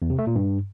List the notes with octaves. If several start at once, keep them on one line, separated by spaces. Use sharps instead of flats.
E2
C3
A3
A#2
G2